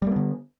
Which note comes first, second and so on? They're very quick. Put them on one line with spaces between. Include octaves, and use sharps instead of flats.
G3 A#3 B3 D3